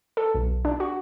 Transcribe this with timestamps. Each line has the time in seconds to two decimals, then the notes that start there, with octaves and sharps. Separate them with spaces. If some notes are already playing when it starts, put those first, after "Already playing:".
0.17 A4
0.35 B1
0.65 D4
0.80 F#4